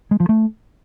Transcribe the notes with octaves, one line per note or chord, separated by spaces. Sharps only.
G#3
F3
A3